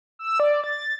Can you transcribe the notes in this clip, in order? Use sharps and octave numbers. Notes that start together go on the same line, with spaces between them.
E6
D5
A6